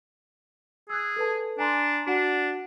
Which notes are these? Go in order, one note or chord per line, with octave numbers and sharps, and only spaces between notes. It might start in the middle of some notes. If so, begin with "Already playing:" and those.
G#4 E6 F#6
A4 B4 A5
D4 G#5 A#5 C6
D4 F#4 F#5